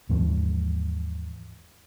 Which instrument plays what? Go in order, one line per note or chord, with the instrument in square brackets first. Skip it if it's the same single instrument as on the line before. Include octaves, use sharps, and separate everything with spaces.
[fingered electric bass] D#2 G#2 E3 F3